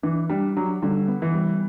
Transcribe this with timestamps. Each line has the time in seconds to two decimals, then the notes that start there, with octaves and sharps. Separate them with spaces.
0.03 E3 D4
0.29 G3 D4
0.57 F#3 D4
0.83 D3 G3
1.08 B3
1.22 E3
1.34 G3